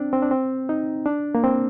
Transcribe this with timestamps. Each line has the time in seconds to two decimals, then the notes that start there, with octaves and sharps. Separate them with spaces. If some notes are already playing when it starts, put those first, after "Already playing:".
Already playing: C4 D4
0.13 C4
0.22 D4
0.31 C4
0.69 D#4
1.06 D4
1.35 A#3
1.44 C4